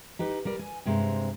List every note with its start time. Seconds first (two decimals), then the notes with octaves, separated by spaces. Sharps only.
0.19 D#4 G4 B4
0.45 G3 A#4 D5
0.59 G#5
0.85 G2 C3 G#3 C4 A#5